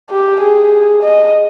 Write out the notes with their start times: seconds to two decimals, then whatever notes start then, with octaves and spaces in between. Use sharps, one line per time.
0.10 G4
0.40 G#4
1.02 D#5